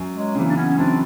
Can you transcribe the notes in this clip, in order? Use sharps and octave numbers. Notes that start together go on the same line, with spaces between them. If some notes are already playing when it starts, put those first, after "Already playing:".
Already playing: F#2
F#3 G#3
C#3 E3 A#3 C4
D4
B3 C#4
C#4
F#2 C4 D4